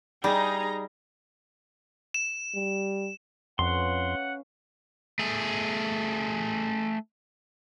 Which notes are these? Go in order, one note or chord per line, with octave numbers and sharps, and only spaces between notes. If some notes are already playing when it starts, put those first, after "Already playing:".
G3 D#4 G#4 A#5
E7
G3
F2 C#4 B4 F5 F#5 C6
A3 G#4